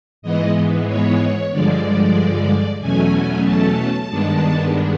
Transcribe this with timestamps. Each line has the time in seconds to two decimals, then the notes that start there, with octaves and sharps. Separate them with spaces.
0.22 G#2 E3 G#3 B3 D#5
0.88 C#5
1.51 G2 D3 F3 G#3 D5
2.80 E2 B2 F#3 A3 C#4 G#5
3.45 A5
4.10 G2 D#3 G#3 B3 D4